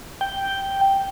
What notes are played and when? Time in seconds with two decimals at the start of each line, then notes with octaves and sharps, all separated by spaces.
0.21 G5